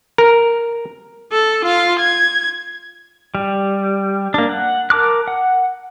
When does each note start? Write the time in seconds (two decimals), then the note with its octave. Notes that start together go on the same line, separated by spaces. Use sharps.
0.18 A#4
1.32 A4
1.65 F4 F5
1.99 G#6
3.35 G3
4.34 A#3 D4
4.49 F#5
4.90 A#4 A5 D6 F#6
5.28 F#5